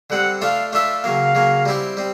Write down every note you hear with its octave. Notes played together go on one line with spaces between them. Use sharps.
D3 G3 C4 F#5
A3 D4 F4 A4 F5
A3 D4 F4 A4 E5
C#3 F#3 A#3 F5
C#3 F#3 A#3
G3 C4 E4 G4
G3 C4